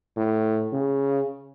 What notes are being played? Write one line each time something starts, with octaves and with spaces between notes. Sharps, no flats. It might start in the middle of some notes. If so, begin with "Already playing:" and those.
A2
C#3